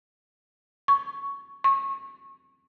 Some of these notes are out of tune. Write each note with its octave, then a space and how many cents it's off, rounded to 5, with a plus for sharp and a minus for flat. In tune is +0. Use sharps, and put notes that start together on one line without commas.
C#6 +5
C#6 -25